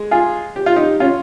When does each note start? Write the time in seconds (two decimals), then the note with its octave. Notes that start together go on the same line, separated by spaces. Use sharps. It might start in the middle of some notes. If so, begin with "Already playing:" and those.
Already playing: G#3
0.11 F4 G#4
0.56 G4
0.66 F4
0.76 D#4 G4
1.00 C#4 F4